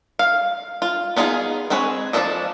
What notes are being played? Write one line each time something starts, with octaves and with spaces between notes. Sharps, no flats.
F5
F4
B3 D4 D#4 F4 G#4
G#3 C4 G#4 B4 C#5
F3 C#4 D4 A4 D#5